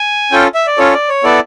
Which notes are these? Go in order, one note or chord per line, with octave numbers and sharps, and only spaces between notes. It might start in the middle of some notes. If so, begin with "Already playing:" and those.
Already playing: G#5
C#4 F4 A4 G5
E5
D5
C#4 F4 A4 C#5
D5
C#5
B3 E4 A4 D5